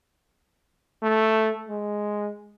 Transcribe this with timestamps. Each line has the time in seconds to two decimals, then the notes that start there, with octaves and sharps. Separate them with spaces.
1.03 A3
1.69 G#3